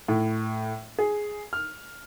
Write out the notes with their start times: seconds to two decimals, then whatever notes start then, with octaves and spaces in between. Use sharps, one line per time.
0.08 A2
0.99 G#4
1.53 F6